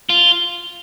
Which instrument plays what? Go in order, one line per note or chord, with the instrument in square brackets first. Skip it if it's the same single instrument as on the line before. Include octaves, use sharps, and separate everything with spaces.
[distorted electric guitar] F4